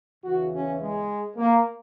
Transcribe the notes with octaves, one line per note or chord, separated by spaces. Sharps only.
E2 C#3 E3 F#4
C#4
G#3
A#3